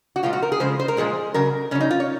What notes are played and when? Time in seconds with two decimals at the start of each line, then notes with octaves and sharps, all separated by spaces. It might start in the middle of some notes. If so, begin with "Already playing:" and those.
0.16 F#4
0.23 A#2 F3 G#3 F4
0.33 F#4
0.42 A#4
0.52 G#4
0.60 C#3 F3 G#3 C5
0.79 C5
0.88 A#4
0.97 A#2 F3 G#3 G#4
1.34 C#3 F#3 A#4
1.71 C#3 C#4
1.75 F#3
1.81 D#4
1.91 F4
2.00 C#5